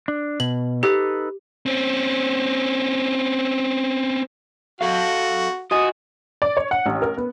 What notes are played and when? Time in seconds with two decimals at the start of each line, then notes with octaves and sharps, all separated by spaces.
0.08 D4
0.40 B2 F#7
0.83 D#4 G4 A4 B4
1.66 C4 C#4
4.81 F#4 A4 F5
5.71 F4 F#4 D#5 F#5 G#5 D#6
6.42 D5
6.57 C#5
6.71 F#5
6.86 A1
7.02 A#4
7.17 B3